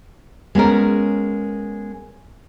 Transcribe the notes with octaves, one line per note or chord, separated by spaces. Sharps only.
G#3 B3 C#4 A#4